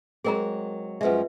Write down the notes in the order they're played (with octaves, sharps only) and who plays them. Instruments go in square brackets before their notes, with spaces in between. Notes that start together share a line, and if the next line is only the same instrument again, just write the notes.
[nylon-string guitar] F#3 G#3 C4 [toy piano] G#4 A#4 A#5
[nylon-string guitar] F#2 F3 G#3 [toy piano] B4 E5